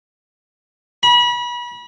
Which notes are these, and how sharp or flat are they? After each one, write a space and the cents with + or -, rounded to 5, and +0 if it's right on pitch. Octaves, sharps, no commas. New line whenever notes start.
B5 -35